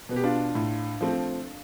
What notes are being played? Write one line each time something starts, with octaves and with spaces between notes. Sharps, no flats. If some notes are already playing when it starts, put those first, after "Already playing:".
B2 B3
G4
D4 F4
A2
F3 A3 C4